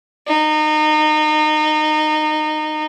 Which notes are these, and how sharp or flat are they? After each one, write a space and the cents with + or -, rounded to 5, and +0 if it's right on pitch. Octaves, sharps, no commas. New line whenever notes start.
D#4 -25